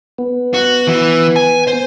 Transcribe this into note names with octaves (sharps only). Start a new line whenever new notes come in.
B3
F#4
E3
G#5
C5